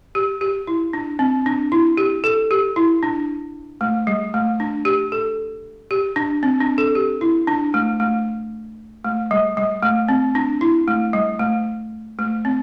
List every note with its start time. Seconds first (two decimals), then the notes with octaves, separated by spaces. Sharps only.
0.15 G4
0.41 G4
0.67 E4
0.93 D4
1.19 C4
1.46 D4
1.72 E4
1.97 G4
2.24 A4
2.51 G4
2.76 E4
3.03 D4
3.81 A3
4.07 G3
4.34 A3
4.60 D4
4.85 G4
5.12 A4
5.91 G4
6.16 D4
6.43 C4
6.60 D4
6.78 A4
6.95 G4
7.21 E4
7.47 D4
7.74 A3
8.00 A3
9.04 A3
9.31 G3
9.57 G3
9.83 A3
10.09 C4
10.35 D4
10.61 E4
10.88 A3
11.13 G3
11.39 A3
12.19 A3
12.45 C4